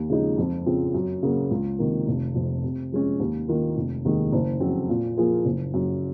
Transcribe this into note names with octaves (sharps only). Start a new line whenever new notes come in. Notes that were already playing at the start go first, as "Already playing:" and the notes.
Already playing: D#2
C#3 F3 G#3 D#4
F2
C#3 F3 C4
F#2
C#3 F#3 A#3
C#2
C3 D#3 A#3
F1
F2 C3
C3
F3 G#3 C#4
D#2
D#3 A#3 F4
F1
D#2 D#3 G#3
F#1
F2 C#3 F#3 C4
A#2
F3 A#3 F4 G#4
F#1
F#2 C#3